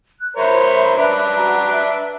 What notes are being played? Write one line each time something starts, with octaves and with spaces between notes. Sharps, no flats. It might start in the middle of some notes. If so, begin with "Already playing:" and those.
F#6
A#4 C5 C#5 E5 B5
D4 B4
F#4 A#5
E5